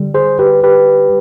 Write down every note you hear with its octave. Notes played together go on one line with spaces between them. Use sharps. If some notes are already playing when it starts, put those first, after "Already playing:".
Already playing: D3 G3
G#4 C5
G4 B4
G4 B4